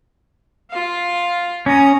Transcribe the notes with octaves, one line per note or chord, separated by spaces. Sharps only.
F4 F5
C#4 A#5 D#6